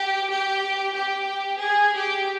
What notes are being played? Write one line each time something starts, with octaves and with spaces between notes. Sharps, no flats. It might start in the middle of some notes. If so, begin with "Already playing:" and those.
Already playing: G4
G4
G4
G#4
G4